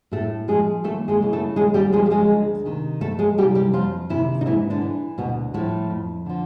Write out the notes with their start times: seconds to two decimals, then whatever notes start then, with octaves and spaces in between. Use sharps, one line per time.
0.12 A2 A3 A4
0.48 F3 G#3 G#4
0.84 D#2 A3 A4
1.08 G#3 G#4
1.21 C#3 E3
1.33 A3 A4
1.56 D#2 G#3 G#4
1.74 G3 G4
1.92 C#3 F3 G#3 G#4
2.06 G4
2.10 G#3 G#4
2.30 D2
2.65 C3 D#3
3.01 F2 A3 A4
3.19 G#3 G#4
3.38 C3 E3 G3 G4
3.55 G3 G4
3.73 F2 F3 F4
4.10 C3 D#3 E3 E4
4.41 D#4
4.46 G#2 E3 E4
4.70 D3 D4
4.81 E3
5.18 D2 B2 B3
5.54 A2 D3 F3 A3
5.90 F2
6.26 D3 F3